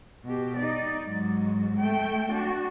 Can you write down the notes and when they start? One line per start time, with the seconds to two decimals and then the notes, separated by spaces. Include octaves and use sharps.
0.24 B2 G4
0.57 D#4 D5
1.04 G#2 F#3
1.77 A3 G5
2.30 D4 F#4